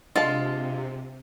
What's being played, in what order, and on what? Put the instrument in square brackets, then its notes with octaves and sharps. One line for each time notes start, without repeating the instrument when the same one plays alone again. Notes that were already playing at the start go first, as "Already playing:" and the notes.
[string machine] C3 [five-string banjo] G#3 A5 [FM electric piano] D4 [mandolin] F4